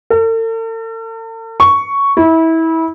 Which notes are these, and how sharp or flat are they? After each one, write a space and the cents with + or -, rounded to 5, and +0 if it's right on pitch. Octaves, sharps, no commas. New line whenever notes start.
A4 +45
C#6 +5
E4 -25